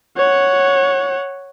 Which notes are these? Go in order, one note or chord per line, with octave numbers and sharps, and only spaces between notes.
C#5 F#5